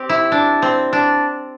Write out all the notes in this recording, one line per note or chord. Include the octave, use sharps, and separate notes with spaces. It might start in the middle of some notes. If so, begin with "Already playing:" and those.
Already playing: C4 G4
E4
D4
C4
D4